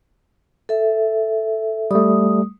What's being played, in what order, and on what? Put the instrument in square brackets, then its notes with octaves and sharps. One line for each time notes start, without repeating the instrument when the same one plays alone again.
[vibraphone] A4 E5
[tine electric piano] G3 A3 [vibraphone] D#6